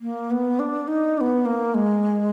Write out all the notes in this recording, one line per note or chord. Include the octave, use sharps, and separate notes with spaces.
A#3
B3
D4
D#4
D4
B3
A#3
G#3